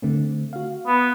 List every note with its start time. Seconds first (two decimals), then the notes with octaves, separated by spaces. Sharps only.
0.02 D3 A3 C4
0.53 F#4 F5
0.87 B3